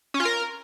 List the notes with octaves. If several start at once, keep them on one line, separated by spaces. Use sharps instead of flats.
C#4
F4
A#4